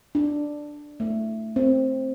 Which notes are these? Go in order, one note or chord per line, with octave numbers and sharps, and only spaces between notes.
D4
A3
C4